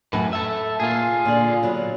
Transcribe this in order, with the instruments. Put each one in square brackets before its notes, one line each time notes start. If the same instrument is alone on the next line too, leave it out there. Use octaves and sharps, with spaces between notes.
[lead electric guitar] F#2 A2 [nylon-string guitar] B4
[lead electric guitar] A4 E5
[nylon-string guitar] A#2 [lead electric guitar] F4 G#4
[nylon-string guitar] A#2 D3 D5
D3 F#3 B3